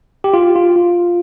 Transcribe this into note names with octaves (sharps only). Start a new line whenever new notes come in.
G4
F4
F4
F4